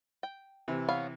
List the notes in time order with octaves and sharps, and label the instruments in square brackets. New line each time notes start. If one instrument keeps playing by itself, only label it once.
[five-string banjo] G5
[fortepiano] C3 E3
[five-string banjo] B3 C#5 F5